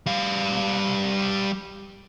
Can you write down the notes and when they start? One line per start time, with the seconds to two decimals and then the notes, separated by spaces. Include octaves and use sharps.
0.06 G3 F5